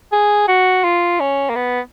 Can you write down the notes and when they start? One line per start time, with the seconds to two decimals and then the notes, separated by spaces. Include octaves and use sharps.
0.12 G#4
0.48 F#4
0.84 F4
1.20 C#4
1.49 A#3
1.55 B3